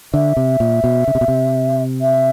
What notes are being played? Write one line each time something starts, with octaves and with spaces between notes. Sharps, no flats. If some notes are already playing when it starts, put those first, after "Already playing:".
D3 E5
C3
A#2
B2
C#3
C3
B2
C3
E5